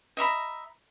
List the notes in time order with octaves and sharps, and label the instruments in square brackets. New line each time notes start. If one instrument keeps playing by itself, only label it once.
[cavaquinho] D#5 E5 A#5 B5